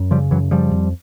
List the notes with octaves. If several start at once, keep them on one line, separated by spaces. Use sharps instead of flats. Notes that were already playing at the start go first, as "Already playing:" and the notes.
Already playing: F#2
C#3 F3 G3
F#2 E3 F#3
C#3 F3 G3
F2